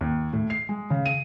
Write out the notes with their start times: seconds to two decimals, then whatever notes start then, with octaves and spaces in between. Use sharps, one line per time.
0.01 D#2
0.33 A2
0.50 C7
0.69 G#3
0.90 C#3
1.06 D#7